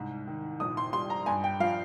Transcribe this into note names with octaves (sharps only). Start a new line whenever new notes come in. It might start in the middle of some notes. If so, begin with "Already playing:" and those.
Already playing: C2 G#2
D#3
A#1 D#6
C6
G3 C6
A#5
G2 G#5
G5
F3 F5